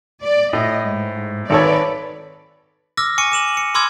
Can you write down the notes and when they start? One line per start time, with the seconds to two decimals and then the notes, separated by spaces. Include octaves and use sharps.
0.24 D5
0.53 A2 D#5
0.87 G#2
1.50 G#1 A4 B4 C#5 D5
2.97 D6 E6 F6 A#6
3.18 G#5 C#6 D6 C#7 D#7
3.32 D6 E7 F#7
3.57 C#7
3.74 B5 C6 D6 E6 F6 G#6